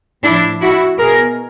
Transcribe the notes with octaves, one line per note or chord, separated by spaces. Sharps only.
A2 F3 D4 E4
E4 F#4
B2 G#4 A#4